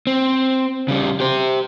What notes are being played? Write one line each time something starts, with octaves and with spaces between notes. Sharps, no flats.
C4
C#3 G3
G4 C5